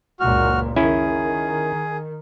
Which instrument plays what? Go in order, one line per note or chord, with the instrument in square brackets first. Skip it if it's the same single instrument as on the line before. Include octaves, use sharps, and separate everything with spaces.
[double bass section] F#1 C#2 A#2 [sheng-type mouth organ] F#4 F6
[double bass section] D#3 [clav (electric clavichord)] C#4 E4 G#5 [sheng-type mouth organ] G#4